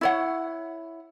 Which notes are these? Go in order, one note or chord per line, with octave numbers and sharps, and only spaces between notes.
E4 C#5 F#5